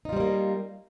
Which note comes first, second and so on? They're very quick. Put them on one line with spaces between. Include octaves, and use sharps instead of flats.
D#4 F4 G3 C4 A#3